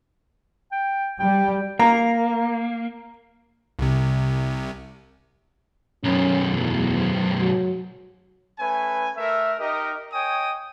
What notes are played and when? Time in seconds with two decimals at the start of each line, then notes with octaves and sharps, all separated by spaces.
0.72 G5
1.19 G3 G5
1.79 A#3 A#5
3.79 C2 C3
6.04 B1 F#2 C#4
6.51 E2
7.39 F#3
8.59 A3 C#4 B4 G#5
9.16 A3 A#4 E5
9.59 D#4 G4 A#4 D#5
10.13 C#5 D#5 G5 G#5 D#6